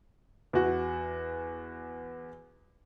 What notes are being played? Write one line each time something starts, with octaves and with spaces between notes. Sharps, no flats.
E2 F#4